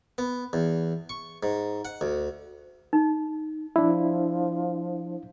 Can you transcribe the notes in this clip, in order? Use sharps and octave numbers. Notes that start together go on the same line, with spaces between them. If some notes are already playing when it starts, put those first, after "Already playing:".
B3
E2
C#6
G#2
F#5
D2
D#4
F3 D4 E4